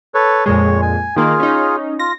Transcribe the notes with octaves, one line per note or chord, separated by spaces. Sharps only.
A4 B4 C#5
F2 A#2 G#3 C#5
G#5
D#3 A#3 F4 G#4
C#4 D#4
F4 A#6